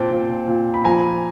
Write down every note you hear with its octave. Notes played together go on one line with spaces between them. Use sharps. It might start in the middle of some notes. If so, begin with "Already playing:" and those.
Already playing: A#2 C4 G5 A5
A#2
A#2
B5
F3 G#5 A#5